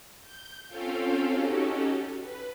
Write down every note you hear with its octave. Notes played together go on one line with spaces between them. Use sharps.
G6
C4 C#4 F4 A4 F5 G5
C#4 D#4 F#4 G4 A4
B4